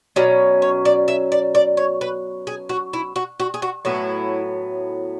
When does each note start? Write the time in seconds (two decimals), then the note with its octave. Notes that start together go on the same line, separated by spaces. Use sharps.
0.16 B2 F#3 C#4 D5
0.62 C#5
0.85 D5
1.08 E5
1.32 D5
1.55 D5
1.77 C#5
2.01 B4
2.47 G#4
2.69 F#4
2.93 E4
3.16 F#4
3.40 F#4
3.54 G#4
3.62 F#4
3.85 A2 F#3 B3 E4